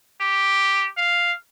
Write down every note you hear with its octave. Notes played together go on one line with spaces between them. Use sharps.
G4
F5